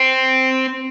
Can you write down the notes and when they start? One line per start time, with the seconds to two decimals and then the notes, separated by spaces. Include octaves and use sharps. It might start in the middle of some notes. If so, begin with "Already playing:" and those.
Already playing: C4